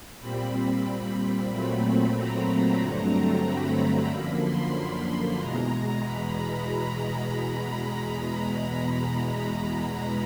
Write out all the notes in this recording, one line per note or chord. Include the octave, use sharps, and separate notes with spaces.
A#2 G3 C4 B5
A#2 F#3 A3 C4
A#5
G2 D3 F#3 A3 C4
B5
A#5
F#2 D3 F3 A#3 B5
C6
B5
E2 B2 G#3 A#5
B5